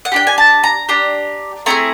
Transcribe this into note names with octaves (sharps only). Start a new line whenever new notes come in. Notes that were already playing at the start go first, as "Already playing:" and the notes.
F#5
D4 G4 G5
G#5
A5
A#5
D4 G4 A#5
A3 C4 E4 G#4 A#5